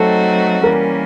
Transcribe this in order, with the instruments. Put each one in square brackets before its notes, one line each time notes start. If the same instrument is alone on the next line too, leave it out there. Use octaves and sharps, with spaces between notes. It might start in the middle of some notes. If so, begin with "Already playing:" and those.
Already playing: [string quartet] F#3 A3 C4 D#4 F#4 [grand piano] A4
[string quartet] E3 G3 A#3 C#4 [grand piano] A#4